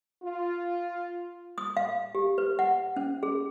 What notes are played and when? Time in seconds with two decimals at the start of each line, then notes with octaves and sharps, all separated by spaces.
0.23 F4
1.58 D#6
1.77 F5
2.15 G4
2.38 B4
2.59 F#5
2.97 C#4
3.23 G#4